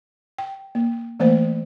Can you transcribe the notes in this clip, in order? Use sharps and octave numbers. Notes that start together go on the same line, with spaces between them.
G5
A#3
E3 A3 A#3 C5